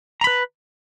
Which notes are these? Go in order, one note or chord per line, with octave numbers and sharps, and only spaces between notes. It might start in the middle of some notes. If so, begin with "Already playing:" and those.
B4 A#5 B5